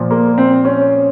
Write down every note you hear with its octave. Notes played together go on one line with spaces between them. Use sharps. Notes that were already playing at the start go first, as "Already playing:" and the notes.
Already playing: A#2 F3
A#3
C4
C#4